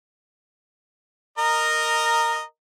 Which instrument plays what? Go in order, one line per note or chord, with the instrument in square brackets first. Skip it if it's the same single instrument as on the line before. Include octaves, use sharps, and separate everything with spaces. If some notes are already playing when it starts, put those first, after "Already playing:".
[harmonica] A#4 D#5 A#5